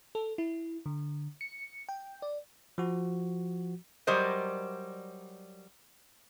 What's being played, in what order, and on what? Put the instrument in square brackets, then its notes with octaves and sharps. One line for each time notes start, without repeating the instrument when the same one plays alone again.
[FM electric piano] A4
E4
D3
C#7
G5
D5
[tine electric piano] F3 F#4
[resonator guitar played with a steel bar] F#3 G3 A#4 C5 D5 D#5